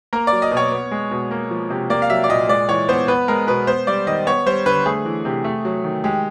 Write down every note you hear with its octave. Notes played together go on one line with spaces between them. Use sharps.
A#3 A#4
D5
F#3
D#5
B2
C#5
B3
G#3
B2
A#3
F3
C3
A#3 D5
F5
F#3 E5
D5
A#2 D#5
G#3 D5
E3 C#5
B3 C5
B3 B4
G#3 A#4
B2 B4
B3 C5
G3 D5
D#3 D#5
B3 C#5
G3 C5
D3 B4
A3 G#4
E3
C3
A3
F#3
D#3
G#3 G4